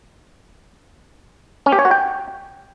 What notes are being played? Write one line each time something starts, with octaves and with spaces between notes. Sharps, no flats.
C#4
G4
C#5
F#4
G5